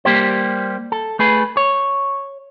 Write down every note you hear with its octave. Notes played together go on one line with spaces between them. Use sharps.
G3 A#3 G4 C5
A4
A3 G#4 B4
C#5